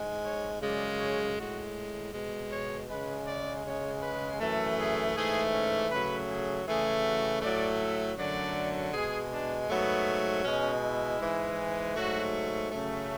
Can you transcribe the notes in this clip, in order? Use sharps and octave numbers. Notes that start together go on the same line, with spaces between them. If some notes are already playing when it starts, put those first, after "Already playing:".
Already playing: G#2 G#3
C#5
F#2 C#3 G#3 D5
C#5
A2 G#3 F#4
B2 G#3
C#5
C#3 G#3 B4
D5
C#3 G#3 C#5
B4
F#2 E3 A3 A4
G#4
G#2 E3 A3 G#4
C#4
C#3 F#3 A3 B4
G#4
C#3 E3 A3 G#4
F#4
A2 F#3 A3 D5
E5
F#2 D3 F#3 A3 D5
B2 G#3 G#4
D4
G#2 F#3 A3 B3
B2 G#3 C#4
E4
G#2 E3 G#3
G#2 F#3 A3 F#4
F#2 C#3 F#3 A3